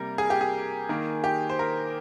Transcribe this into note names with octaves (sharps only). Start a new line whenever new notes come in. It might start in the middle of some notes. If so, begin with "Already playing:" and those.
Already playing: C3 G3 A#3 A#4
G#4
G4
G#4
D#3 A#3
G4
C5
A#4